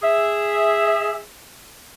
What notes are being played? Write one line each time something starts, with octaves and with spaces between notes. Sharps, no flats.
G#4 E5